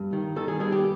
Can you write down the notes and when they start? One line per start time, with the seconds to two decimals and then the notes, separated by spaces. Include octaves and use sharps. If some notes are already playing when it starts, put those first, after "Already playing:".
Already playing: G2
0.13 D#3
0.36 D#3 A4
0.48 G#4
0.60 G2 G#4
0.72 G4